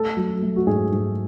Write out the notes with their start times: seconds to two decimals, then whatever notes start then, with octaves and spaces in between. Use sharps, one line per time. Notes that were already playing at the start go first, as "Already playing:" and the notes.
Already playing: A3 A4
0.17 F#3
0.42 A3
0.56 F#4
0.67 G#2 G#4
0.92 G#2